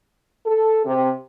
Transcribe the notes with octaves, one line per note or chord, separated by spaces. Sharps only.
A4
C3